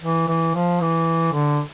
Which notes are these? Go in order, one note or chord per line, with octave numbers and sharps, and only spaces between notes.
E3
E3
F3
E3
D3